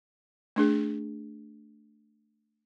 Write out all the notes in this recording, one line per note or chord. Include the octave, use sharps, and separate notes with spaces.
A3 D4 G#4